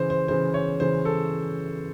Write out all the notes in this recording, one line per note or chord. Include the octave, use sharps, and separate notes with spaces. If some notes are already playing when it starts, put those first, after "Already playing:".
Already playing: C#3 E3 C5
C5
C#3 E3 C5
C#5
C#3 E3 C5
A4